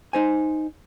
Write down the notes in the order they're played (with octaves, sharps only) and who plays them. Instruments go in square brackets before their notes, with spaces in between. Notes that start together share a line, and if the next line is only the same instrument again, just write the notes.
[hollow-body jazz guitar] D#4 C5 G#5